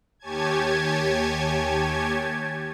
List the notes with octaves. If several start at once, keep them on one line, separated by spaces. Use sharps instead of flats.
D#2 G4 C#5 G#5 A5 G#6